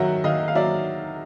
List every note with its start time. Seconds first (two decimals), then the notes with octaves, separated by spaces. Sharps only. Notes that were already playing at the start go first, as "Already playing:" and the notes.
Already playing: D#3 F#3 E5 F#5
0.24 D#3 D#5 F5
0.48 F5
0.55 F#3 D5 E5